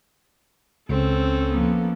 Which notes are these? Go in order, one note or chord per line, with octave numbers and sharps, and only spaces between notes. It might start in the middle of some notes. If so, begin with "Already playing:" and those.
C#2 C4 C#4 A4
F3 A#3 B3